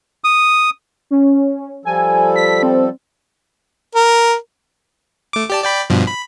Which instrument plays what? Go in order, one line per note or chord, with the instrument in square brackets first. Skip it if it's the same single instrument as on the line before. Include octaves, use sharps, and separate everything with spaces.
[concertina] D#6
[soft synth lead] C#4
[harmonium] F3 G3 A4 [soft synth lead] G#5
[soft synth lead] B6
C4
[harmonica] A#4
[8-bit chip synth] A3 D6
G4 D5 A5
D5 G5 B5
G2 B2 F3
B5